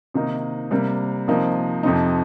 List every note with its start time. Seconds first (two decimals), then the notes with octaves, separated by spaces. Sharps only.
0.14 C3 D#3 A#3 D#4
0.71 C3 G3 A#3
1.28 C3 F3 A#3 D#4
1.83 F2 C3 F3 C4 D#4